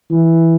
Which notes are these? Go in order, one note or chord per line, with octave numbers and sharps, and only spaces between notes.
E3